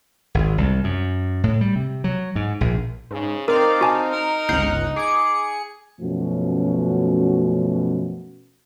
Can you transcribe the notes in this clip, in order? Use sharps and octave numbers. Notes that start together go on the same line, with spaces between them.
G#1
C2
F#2
A2
G3
C3
F#3
G#2
A#1
G#2 C#3
C4 D#4 A#4 D5 F5
F#4 G#5 A5
A#4
G1 C#2 F#5 G6 C7
G#4 D6 C#7
F#2 B2 F3 A3 C#4 F#4